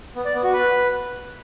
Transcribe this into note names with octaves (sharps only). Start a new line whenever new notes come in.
B3
D5
B3
F#4
B4